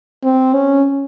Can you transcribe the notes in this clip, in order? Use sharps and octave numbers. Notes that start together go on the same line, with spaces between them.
C4
C#4